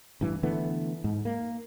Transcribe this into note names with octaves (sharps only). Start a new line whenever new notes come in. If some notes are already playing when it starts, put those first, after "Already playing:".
A1 G2 E3
D3 E3 A3 B3
G#2
A#3